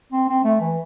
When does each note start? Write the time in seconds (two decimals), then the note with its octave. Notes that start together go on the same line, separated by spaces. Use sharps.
0.12 C4
0.29 C4
0.44 A3
0.60 E3